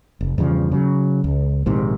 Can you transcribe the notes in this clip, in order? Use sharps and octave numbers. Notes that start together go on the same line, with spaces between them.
F1
E2 G2 C#3 F3
C#3 F#3
C#2
A#1 G#2 C3 D#3